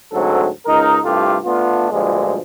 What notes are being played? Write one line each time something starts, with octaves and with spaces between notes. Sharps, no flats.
D2 G#2 F#3 C4 A4
C#2 D#4 A#4
C2 G2 A3 F4 G4 A4
A3 B3 D4 F4
D2 G2 A#2 F3 G#3